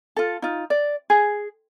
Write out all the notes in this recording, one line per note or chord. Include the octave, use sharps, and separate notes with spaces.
F4 A4
D#4 F4
D5
G#4